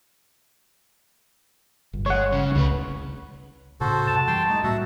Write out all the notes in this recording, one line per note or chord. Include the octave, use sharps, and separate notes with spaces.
G1
G#3 C#5 F#5
C#3
C#2 A2 C#3 B4
A2 C#3 F#4 A4 C5
F#2 C3 A5
E3 G3 G5 C6
A3 D#4
A2 G3 A#3 F#4 E5 F#5